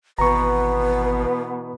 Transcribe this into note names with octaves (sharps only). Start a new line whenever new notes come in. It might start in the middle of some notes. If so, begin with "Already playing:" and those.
G#1 B2 E3 B3 B4 A#5 C#6